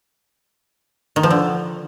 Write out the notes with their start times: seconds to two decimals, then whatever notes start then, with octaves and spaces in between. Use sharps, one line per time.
1.16 D#3
1.23 F3
1.31 D3